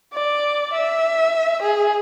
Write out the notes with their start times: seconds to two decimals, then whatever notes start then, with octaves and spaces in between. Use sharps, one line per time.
0.14 D5
0.74 E5
1.63 G#4